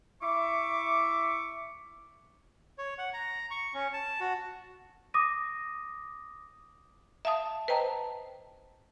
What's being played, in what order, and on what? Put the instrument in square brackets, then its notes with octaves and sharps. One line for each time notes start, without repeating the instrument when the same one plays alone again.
[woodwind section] E4 E5 C#6 D6
[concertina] C#5
F#5
A#5
C#6
C#4
A5
F#4
[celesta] D6 D#6 A#6 D#7
[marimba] E5 F5 A5 D#6
B4 C5 D#5 G5 A5 A#5